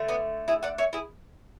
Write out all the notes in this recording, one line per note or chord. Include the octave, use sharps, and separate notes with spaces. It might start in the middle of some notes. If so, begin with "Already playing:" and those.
Already playing: D3 A3
B3 D4
E4 G#4
D5 F#5
C#5 E5
E4 G#4